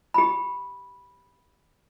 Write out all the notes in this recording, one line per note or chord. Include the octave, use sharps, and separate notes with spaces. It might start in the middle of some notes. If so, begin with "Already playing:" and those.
G4 B5